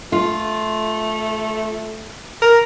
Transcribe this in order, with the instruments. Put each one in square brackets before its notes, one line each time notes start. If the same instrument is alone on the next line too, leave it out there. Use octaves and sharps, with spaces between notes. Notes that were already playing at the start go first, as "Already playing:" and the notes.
[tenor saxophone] A3 [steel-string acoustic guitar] F4
[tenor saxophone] A#4